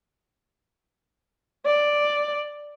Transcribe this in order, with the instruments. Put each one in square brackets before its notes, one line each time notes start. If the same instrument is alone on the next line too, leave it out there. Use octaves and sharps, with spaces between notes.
[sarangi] D5